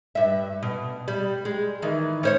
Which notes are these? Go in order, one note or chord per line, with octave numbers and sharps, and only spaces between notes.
G2 E5
B2
G3
G#3
D#3 E3
C#4 C5 C#5